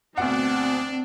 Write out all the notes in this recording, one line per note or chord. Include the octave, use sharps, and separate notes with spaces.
D2 B2 C4 D4 F#5